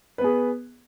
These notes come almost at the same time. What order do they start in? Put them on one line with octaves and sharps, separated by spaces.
B4 B3 G#4